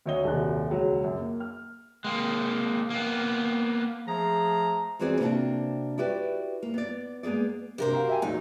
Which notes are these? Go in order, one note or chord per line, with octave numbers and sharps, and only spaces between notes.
D2 F#3 C#5 D#5 G7
D#1 C2 F#3 A5 F#6
E1 C#2 F#3
F#2
A#3
F6
G#3 A#3
A#3 B3
F3 A3 G#4 A#5
E2 E3 C4 F#4 G#4 D5
C3 A#3 C4 D4 F#4 A5
E4 F#4 G4 B4 D5
A#3
B3 D5
G#3 A#3 B3 G#4 D5
G2 C3 G4 A#4 C5
F#4 F5 A#5
E5 G5 G#5
E2 A#2 F#3 D#4